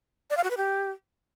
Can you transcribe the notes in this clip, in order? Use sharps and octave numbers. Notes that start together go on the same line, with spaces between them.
D5
F5
F#4
B4
G4